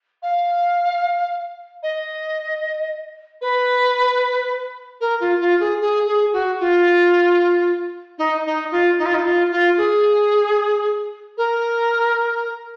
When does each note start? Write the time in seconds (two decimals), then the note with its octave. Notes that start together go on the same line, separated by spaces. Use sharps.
0.22 F5
1.82 D#5
3.41 B4
5.00 A#4
5.20 F4
5.40 F4
5.59 G#4
5.80 G#4
6.06 G#4
6.32 F#4
6.59 F4
8.18 D#4
8.45 D#4
8.71 F4
8.98 D#4
9.05 F4
9.14 D#4
9.24 F4
9.50 F4
9.77 G#4
11.37 A#4